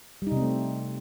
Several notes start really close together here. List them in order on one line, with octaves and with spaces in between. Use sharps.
G3 D#4 C3 C4 A3